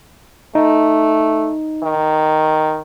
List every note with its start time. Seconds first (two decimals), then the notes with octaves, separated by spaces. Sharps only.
0.55 A3 D#4
1.83 D#3